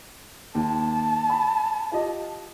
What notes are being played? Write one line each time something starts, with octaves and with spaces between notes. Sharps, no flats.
D#2 A5
B5
F4 G4 D#5